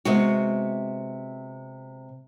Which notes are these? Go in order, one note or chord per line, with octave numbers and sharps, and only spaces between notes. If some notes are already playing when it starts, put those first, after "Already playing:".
C3 G#3 B3 F#4